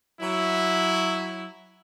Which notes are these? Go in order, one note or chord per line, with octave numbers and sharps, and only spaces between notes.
F#3 E4